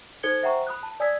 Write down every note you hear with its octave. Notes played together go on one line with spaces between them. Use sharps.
D#4 A4 C5 G#6 C#7 G7
C5 E5 F#5 G5 A#5 C#6
B5 D#6 F#6
A5
D5 G#5 D#6 E6 G#6 B6